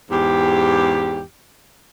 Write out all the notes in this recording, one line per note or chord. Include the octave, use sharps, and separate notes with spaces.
E2 G#2 G4